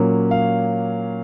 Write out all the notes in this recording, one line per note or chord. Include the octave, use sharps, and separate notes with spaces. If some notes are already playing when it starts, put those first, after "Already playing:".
Already playing: A#2 F#3 A#3 C#4
F5